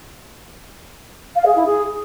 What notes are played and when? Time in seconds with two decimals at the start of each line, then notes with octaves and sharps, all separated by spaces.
1.35 F5
1.45 G#4
1.55 E4
1.65 G#4